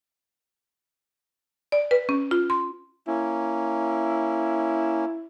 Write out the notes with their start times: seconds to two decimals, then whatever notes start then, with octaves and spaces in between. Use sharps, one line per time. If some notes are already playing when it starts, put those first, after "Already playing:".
1.72 D5
1.91 B4
2.09 C#4
2.31 F4
2.50 C6
3.07 A#3 C#4 E4